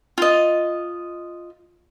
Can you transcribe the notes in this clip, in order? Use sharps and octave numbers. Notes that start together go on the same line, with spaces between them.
F4 D#5